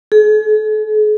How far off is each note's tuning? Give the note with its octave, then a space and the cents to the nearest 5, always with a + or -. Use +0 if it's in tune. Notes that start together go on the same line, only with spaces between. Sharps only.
G#4 +40